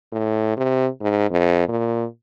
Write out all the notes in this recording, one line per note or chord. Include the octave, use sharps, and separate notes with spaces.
A2
C3
G#2
F2
A#2